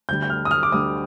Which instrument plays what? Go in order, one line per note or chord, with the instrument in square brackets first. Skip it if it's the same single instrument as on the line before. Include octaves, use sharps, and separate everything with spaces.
[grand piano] D2 D3 G3 G6
G6
F6
D#6
F6
D6
D2 D3 G3 D#6